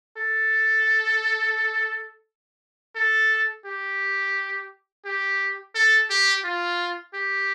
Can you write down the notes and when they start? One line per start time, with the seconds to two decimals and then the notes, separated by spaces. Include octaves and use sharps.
0.17 A4
2.96 A4
3.65 G4
5.05 G4
5.75 A4
6.10 G4
6.44 F4
7.14 G4